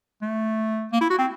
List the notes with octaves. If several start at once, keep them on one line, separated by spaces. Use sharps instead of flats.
A3
A#3
E4
F#4
C4